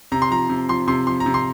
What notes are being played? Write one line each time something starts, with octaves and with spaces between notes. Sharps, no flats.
C3 A#5
C6
F3 A#5
C3
F3 C6
C3 C6
F3 C6
A#5
C3
C6